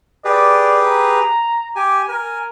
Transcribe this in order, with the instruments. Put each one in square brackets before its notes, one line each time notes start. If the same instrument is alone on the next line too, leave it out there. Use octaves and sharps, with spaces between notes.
[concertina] G4 G#4 B4 [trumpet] D5
[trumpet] A#5
[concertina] G4 G#5 [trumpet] D6
[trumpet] A#4 [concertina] G#5